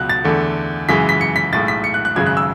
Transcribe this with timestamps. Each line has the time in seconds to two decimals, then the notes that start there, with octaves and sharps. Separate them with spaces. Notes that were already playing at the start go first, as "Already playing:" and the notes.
Already playing: C#2 B2 F#3 F#6
0.09 A6
0.24 E2 D3 A3
0.89 F#2 C#3 E3 G#3 B6
1.09 B6
1.21 C#7
1.36 B6
1.53 B1 A2 G#3 A6
1.68 B6
1.84 C#7
1.94 F#6
2.05 F#6
2.15 G#1 F#2 C#3 G#3 G#6
2.26 F#6
2.37 E6